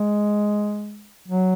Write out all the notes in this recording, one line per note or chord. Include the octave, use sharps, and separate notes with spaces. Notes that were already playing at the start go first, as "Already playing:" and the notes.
Already playing: G#3
F#3